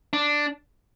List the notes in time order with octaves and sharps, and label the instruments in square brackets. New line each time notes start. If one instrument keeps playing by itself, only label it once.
[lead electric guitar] D4